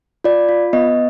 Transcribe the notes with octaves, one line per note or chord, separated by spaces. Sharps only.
F4 D5
F4
B3 D#5